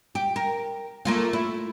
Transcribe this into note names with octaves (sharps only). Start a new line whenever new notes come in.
G4
A#4
A3 A#3 F4
E4